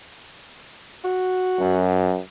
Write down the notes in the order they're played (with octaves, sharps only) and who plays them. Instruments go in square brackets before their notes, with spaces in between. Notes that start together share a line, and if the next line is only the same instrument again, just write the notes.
[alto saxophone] F#4
[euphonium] F#2